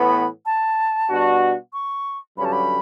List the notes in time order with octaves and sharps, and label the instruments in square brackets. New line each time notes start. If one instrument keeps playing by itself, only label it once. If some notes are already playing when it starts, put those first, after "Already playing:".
Already playing: [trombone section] A2 E3 B3 [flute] B5
[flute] A5
[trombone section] B2 G3 D4 F#4
[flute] C#6
[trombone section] G2 D3 F#3 C#4 G4 [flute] B5
[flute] A5
B5